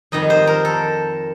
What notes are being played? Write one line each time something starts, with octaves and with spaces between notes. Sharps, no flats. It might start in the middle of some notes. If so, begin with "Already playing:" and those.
F2 D#3 G3 D#5
C5
A#4
A4